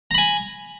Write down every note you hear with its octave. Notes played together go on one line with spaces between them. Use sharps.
G#5 A#5 B5